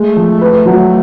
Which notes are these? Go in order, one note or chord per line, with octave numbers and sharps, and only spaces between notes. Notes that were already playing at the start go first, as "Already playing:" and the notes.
Already playing: G#3 A3
F3
B4
F#3